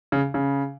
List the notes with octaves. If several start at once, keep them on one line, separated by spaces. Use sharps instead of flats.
C#3
C#3